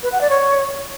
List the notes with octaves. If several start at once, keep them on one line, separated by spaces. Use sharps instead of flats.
B4
F#5
D5
C#5